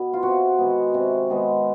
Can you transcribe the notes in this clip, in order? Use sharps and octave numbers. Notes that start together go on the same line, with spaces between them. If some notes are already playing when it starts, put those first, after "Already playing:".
Already playing: B2 B3
F4
C3 F#4
D#3 G#3 B3
C3
D#3 G#3 B3